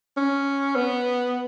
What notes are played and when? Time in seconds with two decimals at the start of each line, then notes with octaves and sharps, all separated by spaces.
0.17 C#4
0.76 B3